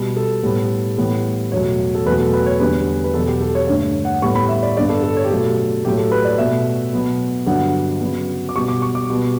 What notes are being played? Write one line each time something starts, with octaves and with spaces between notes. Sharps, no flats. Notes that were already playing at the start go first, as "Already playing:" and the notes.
Already playing: B2 G3 B3
A4
A2 G3 B3
A2 E3 G3 B3
E2 B2 F#3 A3 C#5
A4
E2 B2 F#3 A3 B4
A4
B4
C#5
E2 D3 G3 B3 B4
B4
E2 B2 F#3 B3 A4
G4
A4
C#5
G2 D3 A3 C#5
F#5
A2 G3 B3 C#6
B5
E5
D5
G2 D3 G3 B3 D5
A4
A4
C#5
G4
B2 F#3 A3 A4
A2 F#3 A3 G4
A4
B4
D5
B2 A3 E5
B2 F#3 B3
G2 D3 F#3 B3 F#5
C#3 F#3 B3
D6
B2 G3 B3 C#6
D6
C#6
D6
B2 G3 B3